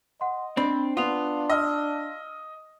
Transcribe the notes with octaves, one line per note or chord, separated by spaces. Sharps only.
D#5 F#5 C6
C4 D4 B5
B3 D4 F4 D#6 F7
D#5 E6 F6